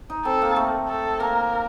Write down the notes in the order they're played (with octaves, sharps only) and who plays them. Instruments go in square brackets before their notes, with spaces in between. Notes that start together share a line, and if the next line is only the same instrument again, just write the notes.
[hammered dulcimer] D#4
[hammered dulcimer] C4 [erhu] A4
[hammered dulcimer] A#3
A3
[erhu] A4
[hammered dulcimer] A#3 [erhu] A#4